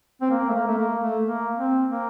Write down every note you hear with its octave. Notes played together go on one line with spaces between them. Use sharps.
C4
A#3
A3
A#3
A3
A#3
A3
A#3
C4
A#3